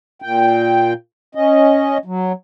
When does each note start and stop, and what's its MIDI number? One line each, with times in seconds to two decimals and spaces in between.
0.22 0.93 46
0.22 0.93 79
1.35 1.98 61
1.35 1.98 75
2.05 2.32 54